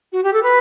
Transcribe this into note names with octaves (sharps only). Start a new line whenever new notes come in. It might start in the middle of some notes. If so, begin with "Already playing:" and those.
F#4
G4
A4
B4